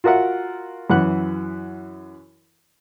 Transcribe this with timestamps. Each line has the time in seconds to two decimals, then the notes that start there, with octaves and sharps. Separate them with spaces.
0.04 F4 F#4 A#4 E5 F#5
0.90 F#2 E3 F#5 F#6